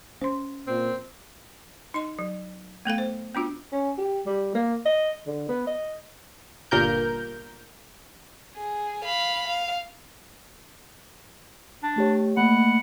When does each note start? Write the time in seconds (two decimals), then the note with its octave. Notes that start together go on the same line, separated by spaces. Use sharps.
0.21 C#4 C5 C6
0.67 A#2 C4
1.94 D#4 D#5 C6
2.19 F#3
2.85 A3 B3 A4 F5
2.98 C5
3.35 B3 D4 F4 F#4
3.72 C#4
3.98 G4
4.26 G3
4.55 A#3
4.86 D#5
5.27 D3
5.48 B3
5.67 D#5
6.71 G1 A#2 A#4 G6
8.55 G#4
9.04 F5 B5
9.47 F5
11.83 D4
11.96 A3 G4 C#5
12.37 A3 A#3 F#5 B5